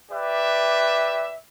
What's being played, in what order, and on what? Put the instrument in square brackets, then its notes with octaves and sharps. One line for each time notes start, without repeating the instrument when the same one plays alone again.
[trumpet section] G4 B4 D5 E5